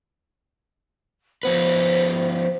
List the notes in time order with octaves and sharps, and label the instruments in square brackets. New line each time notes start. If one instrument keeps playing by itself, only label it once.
[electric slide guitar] F3 B3 B4 [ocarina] C5